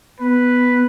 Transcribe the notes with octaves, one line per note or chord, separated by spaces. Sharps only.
B3 B4